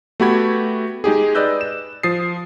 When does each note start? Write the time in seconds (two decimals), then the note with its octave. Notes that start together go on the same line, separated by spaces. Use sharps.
0.20 A3 B3 F#4 G4 B5 G#6
1.04 G#3 D#4 G4 G#4
1.35 B4 D5 D#5 E6 F#6 G6
1.61 E7
2.03 F3 D#6 A6 C7